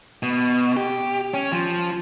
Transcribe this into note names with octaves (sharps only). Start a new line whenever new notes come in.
B2
G4
C#4
F3